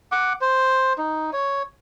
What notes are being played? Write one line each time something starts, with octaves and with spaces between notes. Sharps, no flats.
F#5 D6
C5
D#4
C#5